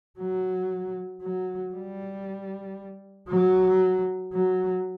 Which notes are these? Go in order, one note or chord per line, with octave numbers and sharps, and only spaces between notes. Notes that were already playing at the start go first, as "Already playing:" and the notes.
F#3
F#3
G3
F#3
F#3